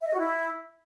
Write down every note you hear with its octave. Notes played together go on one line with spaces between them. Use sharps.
E5
D#5
F#4
E4